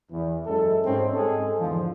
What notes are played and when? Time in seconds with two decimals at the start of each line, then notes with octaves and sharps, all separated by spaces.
0.10 E2
0.46 F#2 G#3 E4 A4
0.84 G#2 G3 G#3 C4 C#4
1.15 G#2 G#3 G#4 A4
1.58 E2 G#2 D3 F3